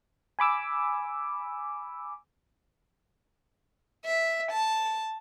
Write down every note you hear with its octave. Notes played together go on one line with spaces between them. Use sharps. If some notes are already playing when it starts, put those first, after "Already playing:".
G#5 B5 D6 E6
E5
A5